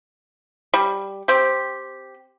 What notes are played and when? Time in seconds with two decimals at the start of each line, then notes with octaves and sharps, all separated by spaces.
0.74 G3
1.28 C4 G4